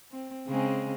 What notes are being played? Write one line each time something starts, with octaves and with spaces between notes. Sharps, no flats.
C4
C#3 G#3 C4